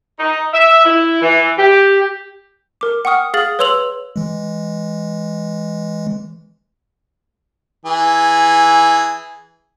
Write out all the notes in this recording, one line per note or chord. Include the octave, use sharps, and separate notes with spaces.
D#4
E5
E4
E3
G4
A#4 D6
F#5 G5 C#6 D#6 F6
G#4 F5 D#6 F6 A6 F#7
B4 C#5 C6 E6 F7 F#7
E3 G#3
E3 G#4